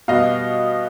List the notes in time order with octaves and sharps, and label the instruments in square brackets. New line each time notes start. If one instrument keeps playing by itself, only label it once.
[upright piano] B2 G3 B3 D#5 F5